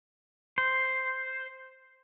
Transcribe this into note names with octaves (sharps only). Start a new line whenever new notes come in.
C5